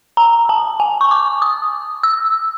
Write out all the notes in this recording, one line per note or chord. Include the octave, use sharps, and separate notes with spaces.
A#5
A5
G#5
C#6
D6
D#6
E6